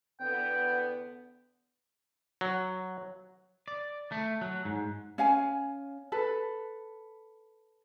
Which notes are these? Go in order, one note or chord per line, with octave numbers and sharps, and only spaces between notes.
E2 D3 B3 G5
F#3
D5
A3
F#3
G#2
C#4 F5 G#5
A4 B4